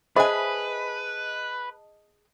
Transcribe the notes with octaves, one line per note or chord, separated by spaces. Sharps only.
G#4 B4 C5 D#5 E5 G#5 A5 B5